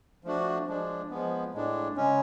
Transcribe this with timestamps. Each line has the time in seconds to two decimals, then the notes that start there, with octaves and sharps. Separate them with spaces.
0.24 F3 A3 D4 F#4
0.67 F3 G#3 D4
1.10 F3 G#3 B3
1.54 A2 G#3 D4
1.96 C#3 G#3 C#4